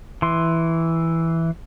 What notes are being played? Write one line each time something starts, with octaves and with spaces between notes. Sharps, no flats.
E3 C6